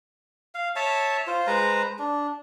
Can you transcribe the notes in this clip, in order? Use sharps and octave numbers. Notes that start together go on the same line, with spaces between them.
F5
C#5 E5 A5
F4 C5
G#3 B4 C5 A#5
D4